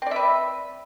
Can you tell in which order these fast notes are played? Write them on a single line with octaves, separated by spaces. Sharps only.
C4 D5 E5 B4